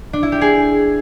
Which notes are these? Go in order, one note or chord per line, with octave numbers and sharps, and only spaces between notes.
D4
E4
G4
G#4